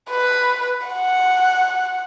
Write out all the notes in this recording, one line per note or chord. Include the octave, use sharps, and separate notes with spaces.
B4
F#5